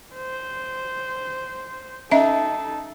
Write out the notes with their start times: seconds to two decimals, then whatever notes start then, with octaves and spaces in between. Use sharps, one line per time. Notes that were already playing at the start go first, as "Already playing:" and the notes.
0.15 C5
2.11 C#4 D#4 A4 D#5 E5